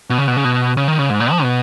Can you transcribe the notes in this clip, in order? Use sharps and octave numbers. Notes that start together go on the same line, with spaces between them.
B2
C#3
B2
C#3
B2
C#3
D#3
C#3
G#2
A#2
F3
B2